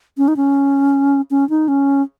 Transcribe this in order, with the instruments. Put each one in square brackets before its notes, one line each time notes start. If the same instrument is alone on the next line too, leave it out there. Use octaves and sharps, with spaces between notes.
[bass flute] C#4
D#4
C#4
C#4
D#4
C#4